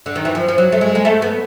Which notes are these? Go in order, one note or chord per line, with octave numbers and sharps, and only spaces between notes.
D3
D#3
E3
F3
F3
F#3
A3
G#3
A#3
A3
B3